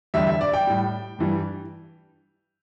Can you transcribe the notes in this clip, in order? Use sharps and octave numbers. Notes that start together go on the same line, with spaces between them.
E2 D3 G3 E5
E5
D5
G5
A2 G3
G2 E3 G3